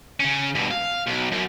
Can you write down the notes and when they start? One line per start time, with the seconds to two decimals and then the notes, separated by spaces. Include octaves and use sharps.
0.20 C#3 C#4
0.55 G2 B2
0.71 F5
1.07 B1
1.32 F#2